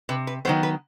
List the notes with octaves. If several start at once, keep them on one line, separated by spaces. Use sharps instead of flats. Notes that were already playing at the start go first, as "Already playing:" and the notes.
C3 B4
B4
D#3 F#3 B3 C5
B4